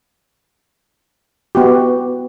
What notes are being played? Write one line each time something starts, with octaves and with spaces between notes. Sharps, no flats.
B3 F#4 G4